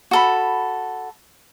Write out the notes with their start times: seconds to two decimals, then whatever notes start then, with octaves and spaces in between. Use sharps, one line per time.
0.11 F#4 A4 B5